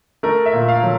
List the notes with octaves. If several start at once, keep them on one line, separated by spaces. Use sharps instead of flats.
A3 A#4
E5
A#2
F5
F#3